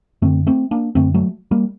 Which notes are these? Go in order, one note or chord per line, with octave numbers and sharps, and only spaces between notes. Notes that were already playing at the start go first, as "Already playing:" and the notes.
F#2 D3 A3 C4
A3 C4
A#3 D4
F#2 D3 A3 C4
F#3 A3
G3 A#3